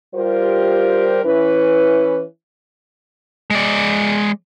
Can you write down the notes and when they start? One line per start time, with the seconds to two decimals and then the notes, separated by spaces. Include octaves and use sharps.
0.15 G3 F4 G4 A#4 C5
1.24 E3 C#4 E4 B4
3.51 G#3 D5